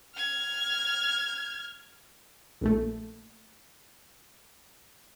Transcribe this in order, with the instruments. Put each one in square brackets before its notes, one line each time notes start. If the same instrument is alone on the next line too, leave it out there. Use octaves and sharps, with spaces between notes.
[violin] F6 G#6
[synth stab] A#1 A#2 A3